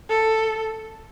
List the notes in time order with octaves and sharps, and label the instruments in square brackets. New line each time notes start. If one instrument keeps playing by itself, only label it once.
[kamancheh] A4